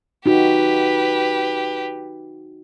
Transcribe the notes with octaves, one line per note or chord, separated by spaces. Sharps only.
D#4 F#4 G4 B4